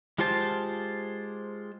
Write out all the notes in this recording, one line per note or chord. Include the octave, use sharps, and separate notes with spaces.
G#3 F4 G4 C5 A5